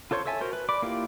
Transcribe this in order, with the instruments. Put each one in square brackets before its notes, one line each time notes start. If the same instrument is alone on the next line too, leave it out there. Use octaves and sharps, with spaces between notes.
[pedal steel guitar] F4 A4 C5 C#5 C6
A4 C#5 E5 G#5 A5
F#4 A#4 C5
B4
D5 B5 D6
A#3 E4 F4 G4